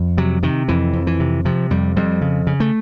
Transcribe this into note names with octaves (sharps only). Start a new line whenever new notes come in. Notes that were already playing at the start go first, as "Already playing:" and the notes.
Already playing: F2
C3 F#3
C3 D#3
F2 E3
F2
E3
C3
C3 F3
F2 G3
F2 G3
C#3
C#3
A3